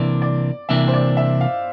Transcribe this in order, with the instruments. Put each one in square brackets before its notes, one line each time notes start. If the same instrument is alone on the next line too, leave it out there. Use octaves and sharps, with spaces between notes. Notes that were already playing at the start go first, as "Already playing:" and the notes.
Already playing: [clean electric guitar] C2 C3 E3 A#3 D4 [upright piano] D5
[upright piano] D5
[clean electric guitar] C2 C3 E3 A#3 D4 [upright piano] E5
[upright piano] C5
D5
E5
F5